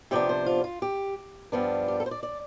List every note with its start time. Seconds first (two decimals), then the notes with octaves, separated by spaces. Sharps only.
0.11 C3 F3 B3 D4 G4
0.29 C5
0.46 F4
0.64 F4
0.82 G4
1.52 G2 F3 B3 D4
1.88 G4
2.00 A4
2.06 C5
2.11 D5
2.23 D5